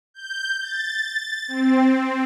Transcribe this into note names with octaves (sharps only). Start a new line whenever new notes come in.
G6
A6
C4